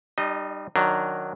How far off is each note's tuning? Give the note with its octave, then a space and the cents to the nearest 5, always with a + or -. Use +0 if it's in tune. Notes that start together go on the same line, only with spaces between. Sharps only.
G3 +0 D#4 -40 D#5 +0
D#3 -15 F#3 +0 D4 -10